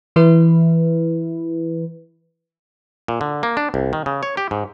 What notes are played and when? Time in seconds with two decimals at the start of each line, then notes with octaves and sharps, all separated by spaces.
0.16 E3 E4 B4
3.08 A#2
3.21 D3
3.43 A#3
3.57 D4
3.74 C2
3.93 D#3
4.06 C#3
4.23 C#5
4.37 G4
4.51 G#2